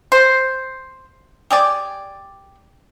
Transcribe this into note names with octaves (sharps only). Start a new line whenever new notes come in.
C5
G4 G#4 D5